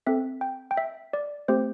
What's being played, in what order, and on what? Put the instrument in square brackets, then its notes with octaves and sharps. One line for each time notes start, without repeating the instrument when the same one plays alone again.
[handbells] C4 A4 E5
G5
G5
E5
D5
A3 C4 G4 C5